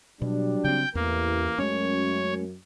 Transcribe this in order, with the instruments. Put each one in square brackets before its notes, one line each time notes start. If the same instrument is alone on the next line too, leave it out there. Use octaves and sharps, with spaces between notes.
[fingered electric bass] B2 [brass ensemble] F#3 G3 D4
[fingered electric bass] C#3 C4 [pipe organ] G5
[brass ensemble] A1 E3 [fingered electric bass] E2 [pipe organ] A#3
[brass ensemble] F#2 [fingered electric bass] G#3 A3 C#4 [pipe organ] C#5